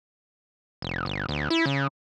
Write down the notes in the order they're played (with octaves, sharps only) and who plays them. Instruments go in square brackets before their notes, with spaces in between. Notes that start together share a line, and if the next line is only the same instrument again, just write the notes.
[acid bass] F1
G1
D2
E4
C#3